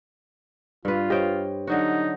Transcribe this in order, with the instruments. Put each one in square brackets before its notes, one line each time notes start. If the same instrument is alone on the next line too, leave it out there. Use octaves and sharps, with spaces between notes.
[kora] G2 B4 [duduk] F4
[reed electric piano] G4 C5 C#5 [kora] D#5 G5
[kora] D3 F#3 F#4 [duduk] D#4